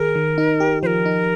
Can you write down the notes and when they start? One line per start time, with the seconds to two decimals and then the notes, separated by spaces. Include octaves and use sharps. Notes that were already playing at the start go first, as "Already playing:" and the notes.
Already playing: D#3 G#4 A#4
0.15 D#3
0.38 D#4
0.60 G4
0.82 F3 A#4 C5
1.05 D#4